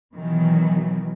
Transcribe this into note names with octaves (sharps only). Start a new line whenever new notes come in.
B2 D#3 E3 F#3